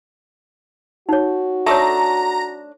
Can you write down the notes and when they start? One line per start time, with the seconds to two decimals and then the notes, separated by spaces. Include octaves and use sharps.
1.09 D#4 F#4 C#5
1.66 A3 D4 A4 C#5 A#5